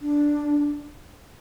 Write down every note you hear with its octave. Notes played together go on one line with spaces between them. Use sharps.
D4